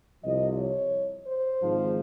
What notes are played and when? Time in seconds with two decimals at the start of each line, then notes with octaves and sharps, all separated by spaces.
0.24 C2 C3 F3 D#5
0.58 C#5
1.28 C5
1.62 G#1 G#2 F3